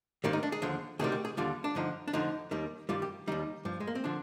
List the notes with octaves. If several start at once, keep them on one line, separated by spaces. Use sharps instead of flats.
G#2 D#3 G3 A#3
D#4
D4
G#4
D#2 D3 F3
D2 C3 D#3 G3 G#4
G4
G#4
D#2 D3 G3 F4
D4
G2 D3 F3 D#4
D4
F2 D3 F3 D#4
D#2 D#3 G3
G2 D#3 G3 F4
G4
D#2 D#3 G3 D#4
G2 F3
G#3
A#3
C4
D3 F3 D4